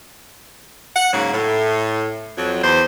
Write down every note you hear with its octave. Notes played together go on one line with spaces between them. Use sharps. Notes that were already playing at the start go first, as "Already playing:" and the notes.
F#5
G#2 C#3 F#3 A#3
A2
F2 F#3
E2 C5